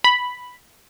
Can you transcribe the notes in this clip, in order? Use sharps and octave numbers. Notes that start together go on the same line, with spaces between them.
B5